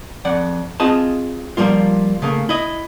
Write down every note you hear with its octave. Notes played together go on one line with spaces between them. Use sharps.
F2 D5 F#5
C4 F4 G#4 D#5 A5
F3 G3 A#3 F4
C#3 A3 A#3
E4 D#5